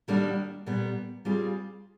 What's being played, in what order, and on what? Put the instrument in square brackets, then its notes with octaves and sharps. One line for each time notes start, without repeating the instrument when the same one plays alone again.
[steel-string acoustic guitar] D#3 G3 A#3 D4 F#4
A#2 G3 B3
G3 C4 F4 G#4